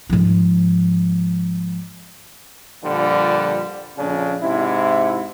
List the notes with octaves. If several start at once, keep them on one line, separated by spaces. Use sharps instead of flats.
G#2 F3
A#2 D3 F3 G3
A#1 F2 C#3 D4
G#2 C3 E4